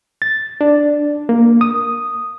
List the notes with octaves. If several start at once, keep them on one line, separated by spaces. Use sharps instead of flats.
A6
D4
A#3
D#6